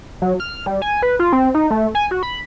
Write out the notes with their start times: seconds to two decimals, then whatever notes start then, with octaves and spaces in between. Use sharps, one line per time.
0.22 F#3
0.40 F6
0.66 G3
0.82 G#5
1.02 B4
1.19 F4
1.33 C4
1.54 D#4
1.71 A3
1.95 G#5
2.11 F#4
2.23 B5